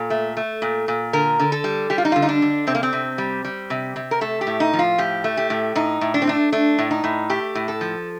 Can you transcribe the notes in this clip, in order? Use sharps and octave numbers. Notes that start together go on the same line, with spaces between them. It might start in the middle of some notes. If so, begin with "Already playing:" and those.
Already playing: A#2 A4
A3
A3
A#2
A#2
D3 A#4
D3
A4
G3
G3 G4
F4
D#4
D3 F4
D#4
D4
D3
C3 C4
A#3
C4
C3
G3
G3
C3
C3
A#4
A3 A4
G4
A2
D#4
F3
F4
A2 G4
A3
G4
A2
A2 D#4
A2
D4
C4
A3 D4
A3 D4
A2
D#4
A2
A3 G4
A2
A4
F3